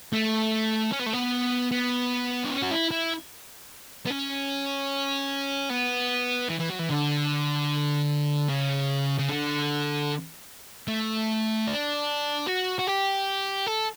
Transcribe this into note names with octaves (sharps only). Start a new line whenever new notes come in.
A3
C#4
B3
A3
B3
B3
D4
C#4
F#4
E4
E4
B3
C#4
B3
E3
E3
F#3
E3
D3
C#3
C#3
D3
A3
D4
F#4
F#4
G4
A4